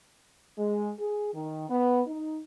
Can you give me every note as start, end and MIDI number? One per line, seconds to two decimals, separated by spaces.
0.57 0.91 56
0.98 1.32 68
1.34 1.66 51
1.69 2.02 59
2.07 2.40 63